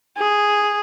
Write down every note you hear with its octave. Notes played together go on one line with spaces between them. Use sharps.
G#4